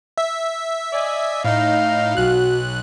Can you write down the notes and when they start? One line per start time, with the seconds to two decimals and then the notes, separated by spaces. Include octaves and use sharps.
0.18 E5
0.93 D5 D#5 G#5
1.45 A2 D#4 F5
2.17 B1 F#4 F#6